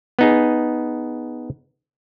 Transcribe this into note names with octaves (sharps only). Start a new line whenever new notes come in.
B3 D#4 G#4